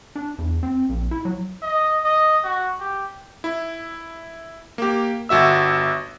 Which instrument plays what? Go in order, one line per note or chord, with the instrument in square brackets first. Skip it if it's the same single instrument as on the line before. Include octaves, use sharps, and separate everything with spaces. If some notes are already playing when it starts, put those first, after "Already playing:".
[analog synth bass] D4
E2
C4
A#1
E4
F#3
[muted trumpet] D#5
D#5
F#4
G4
[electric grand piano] E4
A#3 G4
G1 F#4 E5 E6